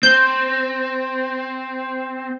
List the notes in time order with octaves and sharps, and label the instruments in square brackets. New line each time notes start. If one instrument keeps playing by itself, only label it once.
[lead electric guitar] C4 [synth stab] G6